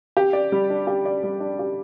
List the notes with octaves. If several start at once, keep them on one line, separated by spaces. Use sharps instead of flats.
G4
D5
G3
D4
G4
D5
G3
D4
G4